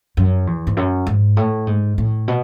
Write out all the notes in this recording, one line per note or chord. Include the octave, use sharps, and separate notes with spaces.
F#2
E2
G#2
F#2
G#2
A2
G#2
A2
B2